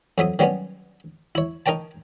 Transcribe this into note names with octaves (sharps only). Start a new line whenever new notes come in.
F2 F#3 E5 D#6
D#3 F#3 G3 B3 C#4
E4 C#5
D#4 A#4 C#5 G5 A5